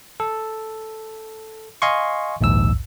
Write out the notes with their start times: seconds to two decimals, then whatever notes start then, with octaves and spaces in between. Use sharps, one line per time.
0.20 A4
1.82 D#5 F5 G#5 C6 C#6
2.41 A#1 D#2 G#2 E6